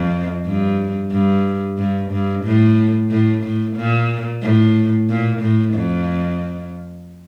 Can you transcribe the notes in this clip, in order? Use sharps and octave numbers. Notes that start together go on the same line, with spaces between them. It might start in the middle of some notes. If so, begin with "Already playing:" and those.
Already playing: F2
G2
G2
G2
G2
A2
A2
A2
A#2
A2
A#2
A2
F2